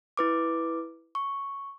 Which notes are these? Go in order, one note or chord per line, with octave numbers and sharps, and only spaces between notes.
E4 B4 D6
C#6